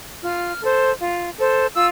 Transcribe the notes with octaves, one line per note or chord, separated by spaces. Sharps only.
F4 F6
A4 C5
F4
A4 C5
F4 E6